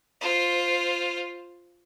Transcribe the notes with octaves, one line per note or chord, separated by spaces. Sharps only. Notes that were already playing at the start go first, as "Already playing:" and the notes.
F4 C5